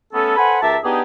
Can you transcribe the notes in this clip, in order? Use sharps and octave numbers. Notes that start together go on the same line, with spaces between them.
A3 B3 C#4 A4
A4 B4 C5 F#5 G#5 B5
C#2 G4 A#4 E5 A5
B3 D4 D#4 G4 G#4